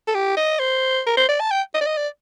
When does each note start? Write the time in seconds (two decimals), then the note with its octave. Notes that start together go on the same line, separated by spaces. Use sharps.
0.07 A4
0.15 G4
0.37 D#5
0.59 C5
1.06 A#4
1.17 C5
1.29 D5
1.40 A5
1.51 G5
1.74 D#5
1.81 D5
1.87 D#5
1.97 D5